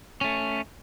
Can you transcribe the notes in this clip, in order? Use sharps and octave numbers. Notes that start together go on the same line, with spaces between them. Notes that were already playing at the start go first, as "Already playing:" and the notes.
A3 C#4